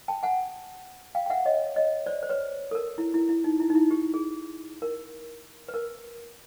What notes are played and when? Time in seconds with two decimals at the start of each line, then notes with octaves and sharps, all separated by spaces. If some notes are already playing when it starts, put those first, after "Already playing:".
0.08 G5 A5
0.23 F#5 G#5
1.15 F5 G5
1.26 G5
1.30 E5 F#5
1.45 C#5 D#5
1.76 C#5 D#5
2.06 C5 D5
2.23 C5
2.29 B4 C#5
2.71 A4
2.75 A#4
2.98 E4
3.14 E4
3.29 E4
3.44 D#4
3.60 E4
3.70 D#4
3.75 E4
3.91 G4
4.14 G#4
4.82 A#4
5.68 B4
5.74 A#4